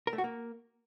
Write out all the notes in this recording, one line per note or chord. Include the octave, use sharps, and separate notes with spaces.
A#4
A3
F#4
A#3